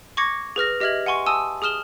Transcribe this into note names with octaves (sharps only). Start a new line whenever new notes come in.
C#6 D6 G#6 A#6 C#7
G#4 B4 F6 A#6
G4 D#5 E5 F6 G#6 F#7
F#5 G#5 C6 C#6
G#5 A5 C6 D#6 E6
G#4 D#6 F6 E7 G7